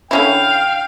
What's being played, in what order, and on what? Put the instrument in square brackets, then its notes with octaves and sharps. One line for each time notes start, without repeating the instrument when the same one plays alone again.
[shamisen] D3 C#4 E4 [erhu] F5 [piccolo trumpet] G5